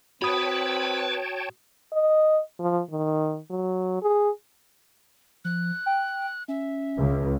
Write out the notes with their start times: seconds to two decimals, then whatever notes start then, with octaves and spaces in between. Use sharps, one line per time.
0.22 C4 F#4 B4 C#5 G5 A5 B5 D#6
1.93 D#5
2.60 F3
2.90 D#3
3.51 F#3
4.02 G#4
5.45 F3 F#6
5.86 G5
6.48 C#4 E5
6.97 C#2